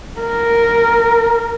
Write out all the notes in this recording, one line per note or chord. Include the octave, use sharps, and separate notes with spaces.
A#4